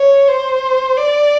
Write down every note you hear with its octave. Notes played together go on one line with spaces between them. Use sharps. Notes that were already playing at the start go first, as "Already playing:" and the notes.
Already playing: C#5
C5
D5